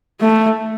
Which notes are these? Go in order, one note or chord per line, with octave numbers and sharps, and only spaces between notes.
A3